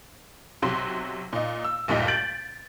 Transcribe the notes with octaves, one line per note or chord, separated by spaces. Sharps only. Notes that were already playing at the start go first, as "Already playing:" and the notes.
B1 C3 F#3 C6
A#2 D#4
E6
F#1 D2 G2 A#2 D#4 B6
G6 A6 D7 F#7